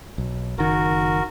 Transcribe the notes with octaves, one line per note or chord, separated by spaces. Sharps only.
B1
F#1 D#3 F#4 A#4